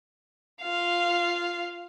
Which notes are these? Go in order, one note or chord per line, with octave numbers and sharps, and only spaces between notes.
F4 F5